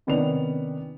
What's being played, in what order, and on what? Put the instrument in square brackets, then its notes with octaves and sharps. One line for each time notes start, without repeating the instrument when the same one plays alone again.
[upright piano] C3 D#3 B3 C#4 D5 F7